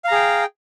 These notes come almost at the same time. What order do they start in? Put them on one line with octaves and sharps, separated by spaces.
F5 A#5 G#4 G5